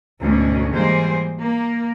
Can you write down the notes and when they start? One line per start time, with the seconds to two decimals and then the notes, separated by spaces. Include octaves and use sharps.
0.22 D2 G#2 B2 C#4
0.73 G#2 E3 G3 A#3 G#4 C5
1.38 A#3